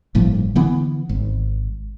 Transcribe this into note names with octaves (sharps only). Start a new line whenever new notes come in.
G1 A2 F3 A#3
D3 E3 B3
G#1